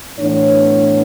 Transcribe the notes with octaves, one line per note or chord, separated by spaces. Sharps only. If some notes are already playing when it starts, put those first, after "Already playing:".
A2 E3 B3 D4 C#5